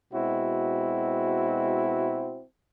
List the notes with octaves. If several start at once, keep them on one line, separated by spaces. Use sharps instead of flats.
B2 G#3 C4 E4 F#4